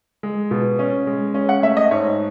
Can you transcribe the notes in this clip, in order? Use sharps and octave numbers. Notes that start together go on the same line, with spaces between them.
G#3
B2
C#4
G#3
C#4
F#5
A3 E5
D#5
G#2 C#5